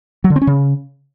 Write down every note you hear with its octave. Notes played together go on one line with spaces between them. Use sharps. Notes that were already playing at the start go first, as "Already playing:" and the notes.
F#3
D3
C4
C#4
C#3